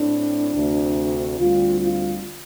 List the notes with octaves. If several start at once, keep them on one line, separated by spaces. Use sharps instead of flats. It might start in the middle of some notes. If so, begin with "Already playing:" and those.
Already playing: A2 A3 C4 D4
D2 C3 A3
D2 D3 G3 C4 F4
F4